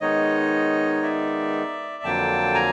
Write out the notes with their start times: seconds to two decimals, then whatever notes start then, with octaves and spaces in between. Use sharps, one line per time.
0.01 D#3 G#3 B3 D#4 C#5 D#5
1.02 D5 E5
2.03 F2 D3 F#3 A#3 G5 A5
2.54 G#5 A#5